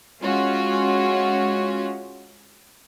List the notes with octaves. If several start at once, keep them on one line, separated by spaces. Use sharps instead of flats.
G#3 C#4 F4 F#4